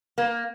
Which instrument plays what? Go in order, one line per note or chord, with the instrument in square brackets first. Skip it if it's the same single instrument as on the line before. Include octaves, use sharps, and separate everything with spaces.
[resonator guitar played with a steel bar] A#3